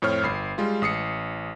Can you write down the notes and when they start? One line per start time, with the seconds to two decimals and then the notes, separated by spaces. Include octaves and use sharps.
0.02 F2 A2 C5 C#5 F6
0.23 G1 B5 C7
0.58 G3 G#3 F4
0.82 A1 D#6 C7 C#7